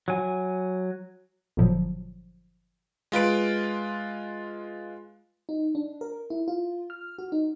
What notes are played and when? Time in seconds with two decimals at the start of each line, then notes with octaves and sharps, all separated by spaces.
0.08 F#3 G#5
1.57 G1 A#2 F3 F#3
3.12 G#3 F4 B4 D7
5.49 D#4
5.75 D4
6.01 A#4
6.30 E4
6.48 F4
6.90 F6
7.19 F#4
7.32 D#4